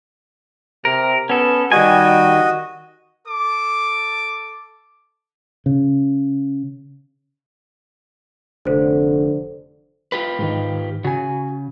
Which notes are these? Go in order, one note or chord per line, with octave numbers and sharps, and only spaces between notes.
C3 A#4
B3 C#4 A4
D#3 G3 F#4 D#5 G#5
A4 D6
C#3
F1 D3 A4 C5
F4 G4 B4
G#2 D#3
C#3 F#4 G#5